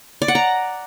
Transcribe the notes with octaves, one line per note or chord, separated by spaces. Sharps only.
D5
F#5
A#5